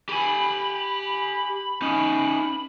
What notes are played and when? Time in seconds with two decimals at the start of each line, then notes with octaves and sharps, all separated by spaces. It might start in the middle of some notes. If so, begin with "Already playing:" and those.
0.09 G4 G#5 B5
1.82 C#4 D#4